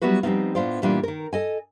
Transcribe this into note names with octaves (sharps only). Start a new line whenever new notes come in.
F#3 G3 B3 E4 F#4 B4
F3 G3 B3 C4 D#4 F4
A2 B3 D4 F4 C5 D5
A#2 E3 G3 B3 D4 F4
D#3 A#4
A4 D#5 G#5